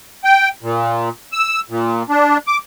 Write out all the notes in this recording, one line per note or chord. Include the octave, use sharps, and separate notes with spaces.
G5
A#2
E6
A#2
D4
D6